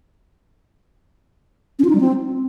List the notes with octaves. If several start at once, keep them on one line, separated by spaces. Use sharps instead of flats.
C#4
F4
D#4
G3
C4